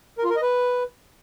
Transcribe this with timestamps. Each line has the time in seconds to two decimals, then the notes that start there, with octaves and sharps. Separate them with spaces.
0.18 A#4
0.24 F4
0.30 A#4
0.36 D#5
0.42 B4